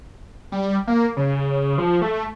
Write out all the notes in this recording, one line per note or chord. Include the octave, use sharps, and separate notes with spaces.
G3
A#3
C#3
F3
A3